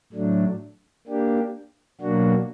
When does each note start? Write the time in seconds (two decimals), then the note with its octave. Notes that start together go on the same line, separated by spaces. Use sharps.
0.12 A2 F#3 A3 D4
1.07 A#3 D4 G4
2.01 B2 F#3 A#3 D4 F#4